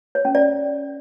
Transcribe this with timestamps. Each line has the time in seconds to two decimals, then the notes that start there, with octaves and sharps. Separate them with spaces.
0.15 C#5
0.25 C#4
0.35 D5